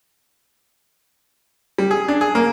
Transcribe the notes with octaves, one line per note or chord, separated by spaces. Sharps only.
G3
G#4
D4
G#4
A#3